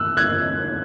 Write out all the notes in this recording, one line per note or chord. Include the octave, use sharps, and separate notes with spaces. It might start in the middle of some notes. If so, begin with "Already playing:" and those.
Already playing: E6 F#6
F#6 G#6